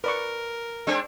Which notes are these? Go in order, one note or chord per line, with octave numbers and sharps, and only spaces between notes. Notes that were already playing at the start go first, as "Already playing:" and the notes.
A#4 B4 D5 C#6
G#3 C4 D4